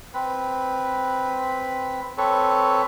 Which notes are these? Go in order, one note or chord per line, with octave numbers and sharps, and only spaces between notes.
C4 B4
C4 A4 B4 C#5